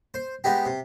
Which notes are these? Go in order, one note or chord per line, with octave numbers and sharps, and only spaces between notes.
C5
G#3 B3 D#4 G4
C3